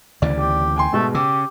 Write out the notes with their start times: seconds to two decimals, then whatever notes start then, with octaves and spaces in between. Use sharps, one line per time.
0.22 D2 C#3 E3 D5
0.39 G4
0.76 G5 G#5 C6
0.93 G#2 B2 G#3 A3
1.15 C#3 G4 E6